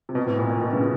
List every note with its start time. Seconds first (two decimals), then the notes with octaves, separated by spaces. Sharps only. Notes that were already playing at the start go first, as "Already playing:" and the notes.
0.09 C3
0.15 B2
0.27 A2
0.39 A#2
0.50 A#2
0.61 B2
0.73 C#3